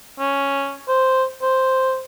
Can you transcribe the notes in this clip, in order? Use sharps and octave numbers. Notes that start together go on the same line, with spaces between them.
C#4
C5
C5